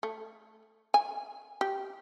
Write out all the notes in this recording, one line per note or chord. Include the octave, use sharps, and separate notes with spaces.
A3
G#5
G4